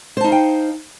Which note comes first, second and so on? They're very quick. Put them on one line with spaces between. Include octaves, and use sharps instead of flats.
C5 A5 D#4 F5 G5